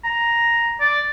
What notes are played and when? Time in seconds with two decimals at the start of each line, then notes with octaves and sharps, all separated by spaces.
0.04 A#5
0.80 D5